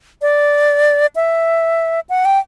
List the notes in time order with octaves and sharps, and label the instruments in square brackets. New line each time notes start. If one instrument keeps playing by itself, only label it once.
[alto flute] D5
E5
F#5
G5